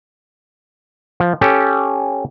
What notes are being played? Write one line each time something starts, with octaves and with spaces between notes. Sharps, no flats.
F3
C#4 G4 A4